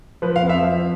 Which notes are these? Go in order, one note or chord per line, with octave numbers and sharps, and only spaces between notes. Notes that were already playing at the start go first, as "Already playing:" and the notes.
F3 B4
F5
F2
E5
F3